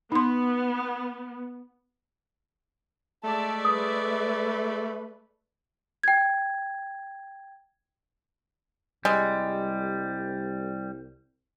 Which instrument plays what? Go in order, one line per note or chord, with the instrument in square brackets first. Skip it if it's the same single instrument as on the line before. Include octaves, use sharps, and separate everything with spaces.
[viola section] B3 [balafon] D#4 C6
[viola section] G#3 D5 E5 [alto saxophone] A3 [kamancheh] A5
[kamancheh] B4 [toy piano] D#6
[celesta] G5 G#6
[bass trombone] C2 [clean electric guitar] G3 [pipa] G#3